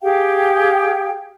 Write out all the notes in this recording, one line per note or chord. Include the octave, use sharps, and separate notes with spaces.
G4 G#4 F5 G5